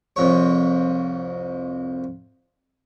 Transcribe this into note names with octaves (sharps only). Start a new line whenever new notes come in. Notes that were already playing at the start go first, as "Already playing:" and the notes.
C2 F2 C#5